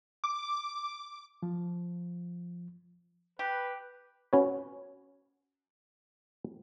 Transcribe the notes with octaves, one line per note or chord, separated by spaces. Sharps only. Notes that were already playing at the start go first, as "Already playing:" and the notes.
D6
F3
G4 B4
C#4 F#4 B4 C#5